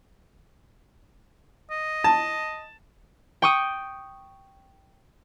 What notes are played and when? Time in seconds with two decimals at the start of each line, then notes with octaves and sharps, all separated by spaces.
1.70 D#5
2.04 A5
3.42 G5 C#6 D#6